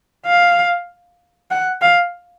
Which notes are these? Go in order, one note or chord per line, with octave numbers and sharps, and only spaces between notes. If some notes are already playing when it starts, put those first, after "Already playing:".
F5
F#5
F5